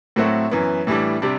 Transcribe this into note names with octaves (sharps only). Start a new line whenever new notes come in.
A2 F#3 A3 C4 F#4
F#2 E3 B3
A2 E3 G3 D4
C3 G3 D4